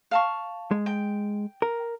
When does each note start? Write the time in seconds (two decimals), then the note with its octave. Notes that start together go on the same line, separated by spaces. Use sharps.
0.11 F5 A5 C#6
0.71 G#3
0.86 G5
1.62 A#4